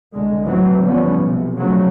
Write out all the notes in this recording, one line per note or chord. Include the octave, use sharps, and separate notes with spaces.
C2 D3 G#3
A1 A2 E3 F#3 C4
F#1 D3 F3 G3 B3 C#4
B1 C3
C#3 F3 F#3 A3 C4